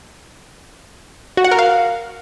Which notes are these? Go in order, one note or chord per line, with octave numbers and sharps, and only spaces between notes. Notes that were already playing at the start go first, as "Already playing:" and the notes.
F#4
F#5
A#4
F5